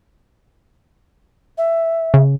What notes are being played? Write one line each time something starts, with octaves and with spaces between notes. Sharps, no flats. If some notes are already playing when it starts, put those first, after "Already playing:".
E5
C#3